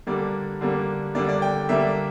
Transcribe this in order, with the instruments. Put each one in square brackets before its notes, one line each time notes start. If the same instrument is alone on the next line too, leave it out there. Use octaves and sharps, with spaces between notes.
[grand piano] D3 G3 A#3 D4 D5
D3 G3 A#3 D4
D3 G3 A#3 D4 D5
D5
G5
D3 G3 A#3 D4 E5